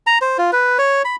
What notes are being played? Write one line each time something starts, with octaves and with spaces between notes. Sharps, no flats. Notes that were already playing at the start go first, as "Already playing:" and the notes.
A#5
C5
F4
B4
C#5
B5